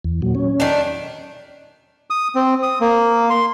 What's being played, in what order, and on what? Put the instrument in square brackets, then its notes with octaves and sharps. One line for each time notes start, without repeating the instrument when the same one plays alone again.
[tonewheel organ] E2
A#2 F#3
C#4
[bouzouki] D#3 A3 D4
[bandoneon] D#6
C4
D#6
A#3
C6